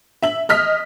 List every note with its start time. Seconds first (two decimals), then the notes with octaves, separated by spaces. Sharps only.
0.23 E5 F#7
0.49 D#5 F6 B6